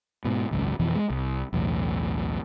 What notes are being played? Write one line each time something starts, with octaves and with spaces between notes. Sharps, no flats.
G#2 B2
G#1 C#2 F#2
F2 B2 E3 F3
G#3
C2
B1 E2 A2